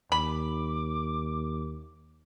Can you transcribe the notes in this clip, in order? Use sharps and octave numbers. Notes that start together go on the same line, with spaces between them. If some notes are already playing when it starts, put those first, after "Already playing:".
D#2 B5 D6